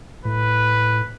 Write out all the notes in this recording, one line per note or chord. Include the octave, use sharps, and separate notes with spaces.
A2 B4